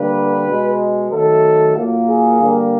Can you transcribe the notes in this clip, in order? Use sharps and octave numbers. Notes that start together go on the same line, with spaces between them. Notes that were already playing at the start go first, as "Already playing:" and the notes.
Already playing: D3 G3 A#3 B4
B2 G#3
D#3 F#3 A3 A4
A#2 F#3 A#3
G#4
D3 G3 A#3